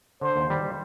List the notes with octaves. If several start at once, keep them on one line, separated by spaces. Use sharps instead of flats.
D3 C5
D#2
G3